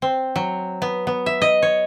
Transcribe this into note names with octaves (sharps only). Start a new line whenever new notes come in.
C4
F#3
B3
B3
E5
D#5
C#5